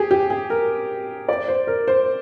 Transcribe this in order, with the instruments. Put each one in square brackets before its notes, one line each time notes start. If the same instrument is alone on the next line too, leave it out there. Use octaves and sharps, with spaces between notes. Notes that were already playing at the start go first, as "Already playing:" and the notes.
Already playing: [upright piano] G4 G#4
G4
G#4
A#4
D5
C5
A#4
C5